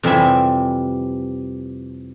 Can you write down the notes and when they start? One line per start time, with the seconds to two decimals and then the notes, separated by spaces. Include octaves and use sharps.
0.03 F2 C3 E3 G3 E5 G#5